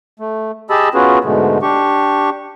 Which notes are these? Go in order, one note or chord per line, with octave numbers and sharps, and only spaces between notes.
A3
G4 G#4 D#5 A5 B5 E6
B3 C#4 F4 F#4 G#4 B4
G#2 B2 D3 G#3 A3
D4 G4 C#6